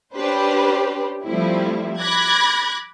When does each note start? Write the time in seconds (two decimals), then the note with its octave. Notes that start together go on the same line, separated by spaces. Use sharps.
0.15 C#4 D4 G4 B4 C5
1.25 F3 G3 A3 C4 E4
1.98 B5 D6 F#6 G#6 A#6